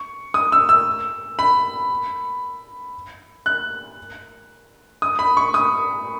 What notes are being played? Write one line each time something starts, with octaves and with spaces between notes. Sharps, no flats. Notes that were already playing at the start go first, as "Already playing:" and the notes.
Already playing: C#6
D#6
E6
E6
B5
F#6
D#6
B5
C#6
D#6